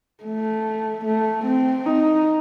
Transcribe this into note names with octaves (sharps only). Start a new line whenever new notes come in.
A3
A3
C4
D#4